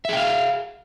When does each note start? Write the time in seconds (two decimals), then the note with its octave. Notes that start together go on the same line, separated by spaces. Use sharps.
0.05 E5
0.09 G#4
0.13 G5
0.17 F5